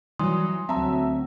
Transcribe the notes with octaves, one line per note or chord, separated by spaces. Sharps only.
E3 F#3 G3 C6 D#6
D2 F#3 C4 E5 A5 A#5